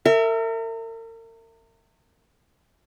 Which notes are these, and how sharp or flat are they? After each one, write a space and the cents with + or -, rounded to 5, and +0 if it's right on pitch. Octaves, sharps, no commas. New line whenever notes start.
A#4 -40 E5 +0